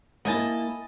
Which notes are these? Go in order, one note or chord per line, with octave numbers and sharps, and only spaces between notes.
A#3 E4 D#5 G#5 A5